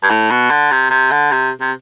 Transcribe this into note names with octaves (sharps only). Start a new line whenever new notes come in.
G2
A2
B2
D3
C3
C3
D3
C3
C3